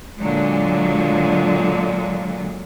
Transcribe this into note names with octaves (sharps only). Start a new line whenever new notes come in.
A#2 D3 F#3 G#3